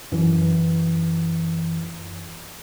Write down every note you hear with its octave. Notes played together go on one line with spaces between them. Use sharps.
F#2 E3